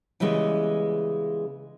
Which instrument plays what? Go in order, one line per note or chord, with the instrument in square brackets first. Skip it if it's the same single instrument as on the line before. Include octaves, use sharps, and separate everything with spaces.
[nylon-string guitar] C#3 E3 G3 G#3 B3